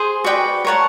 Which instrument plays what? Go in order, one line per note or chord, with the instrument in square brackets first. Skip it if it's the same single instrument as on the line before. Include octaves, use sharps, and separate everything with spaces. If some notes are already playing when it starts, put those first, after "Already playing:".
Already playing: [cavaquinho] G#4 C5
F#4 B4 D5 G5
A#4 C#5 F#5 A5